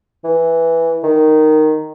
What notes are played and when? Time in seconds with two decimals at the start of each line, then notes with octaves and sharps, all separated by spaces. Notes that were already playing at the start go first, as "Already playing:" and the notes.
0.24 E3
1.04 D#3